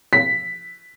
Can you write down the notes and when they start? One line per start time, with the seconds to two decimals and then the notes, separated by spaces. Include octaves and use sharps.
0.13 B6